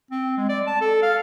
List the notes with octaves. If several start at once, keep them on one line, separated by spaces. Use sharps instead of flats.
C4
G#3
D5
A5
A4
F5